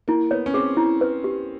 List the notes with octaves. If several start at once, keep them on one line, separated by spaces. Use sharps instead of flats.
A#3 E4
B3 C#5
C#4
C4 G#4
E4
B4
G4